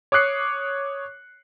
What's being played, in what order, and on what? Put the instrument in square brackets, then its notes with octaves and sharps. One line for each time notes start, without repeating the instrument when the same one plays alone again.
[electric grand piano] C#5 D6 D#6 F#6 C7 C#7